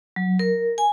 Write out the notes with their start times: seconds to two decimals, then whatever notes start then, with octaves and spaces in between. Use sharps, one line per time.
0.16 F#3
0.39 A#4
0.78 G#5